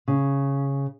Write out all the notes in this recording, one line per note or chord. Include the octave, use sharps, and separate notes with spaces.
C#3